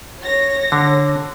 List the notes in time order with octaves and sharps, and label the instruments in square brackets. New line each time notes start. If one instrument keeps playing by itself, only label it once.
[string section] C#5 A#6
[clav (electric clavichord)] D3